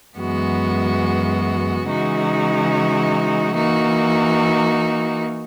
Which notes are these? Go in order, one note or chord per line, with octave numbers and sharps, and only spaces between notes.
F#2 E3 G#3 B3 F#4
C#3 E3 G#3 D#4 F#4
E3 A#3 D#4 F#4